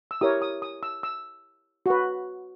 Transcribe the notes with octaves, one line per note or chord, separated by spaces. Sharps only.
E6
E4 G4 A#4 C#5 D#6
D#6
D#6
E6
E6
F#4 B4